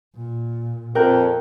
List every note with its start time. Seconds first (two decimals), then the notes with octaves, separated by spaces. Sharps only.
0.16 A#2
0.95 F2 A#4 G5 F#6